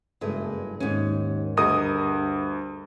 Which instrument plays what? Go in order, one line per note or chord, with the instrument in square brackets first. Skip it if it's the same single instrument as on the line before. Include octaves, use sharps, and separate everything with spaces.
[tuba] F#1 [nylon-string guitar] G2 G#3 A3
[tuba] D#2 [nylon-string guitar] G#2 C#4
[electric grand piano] D2 D#6 [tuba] G2 [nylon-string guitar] G#4 A#4 D#5